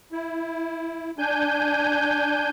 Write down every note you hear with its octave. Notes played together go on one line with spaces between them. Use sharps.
E4
D4 G#5 G6